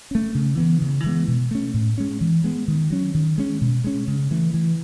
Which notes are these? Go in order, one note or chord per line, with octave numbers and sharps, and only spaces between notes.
A3 C#4
C#3
E3 B3
C#3
E3 G#3 B3
B2
A3 C#4
A2
G#3 C#4
E3
G#3 B3
D#3
F#3 C#4
D#3
G#3 C#4
B2
G#3 C#4
C#3
E3 A3
E3